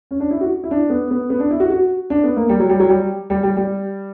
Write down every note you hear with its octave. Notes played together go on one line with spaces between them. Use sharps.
C#4
D4
E4
F#4
E4
D4
B3
B3
B3
D4
E4
F#4
F#4
D4
B3
A#3
G3
F#3
G3
F#3
G3
G3
G3
G3